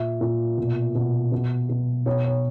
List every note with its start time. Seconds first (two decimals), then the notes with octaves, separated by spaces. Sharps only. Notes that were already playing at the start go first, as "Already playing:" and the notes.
Already playing: A#2 E5
0.21 A#2
0.58 B2
0.95 B2
1.32 B2
1.69 B2
2.06 B2 C#5
2.25 C#5